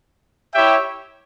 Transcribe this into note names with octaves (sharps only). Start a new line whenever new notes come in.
E4 G4 C#5 E5 G5